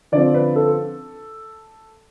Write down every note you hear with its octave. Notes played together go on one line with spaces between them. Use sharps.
D3 F3 C4 D5
B4
A4